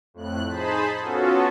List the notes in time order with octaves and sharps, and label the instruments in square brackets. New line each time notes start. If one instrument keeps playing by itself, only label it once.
[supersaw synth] F2 A2 F#6
D#4 G#4 C5 A5 B5
B3 C#4 F4 F#4 A4